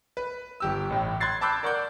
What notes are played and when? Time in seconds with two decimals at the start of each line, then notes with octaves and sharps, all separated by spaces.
0.17 B4
0.60 G1 G4 E6
0.90 A1 A2
1.20 C6 F#6 G#6 A6 C7
1.41 A5 B5 D6 E6 F#6 G6
1.63 A#4 D5 F#5 C#6 F#6 G6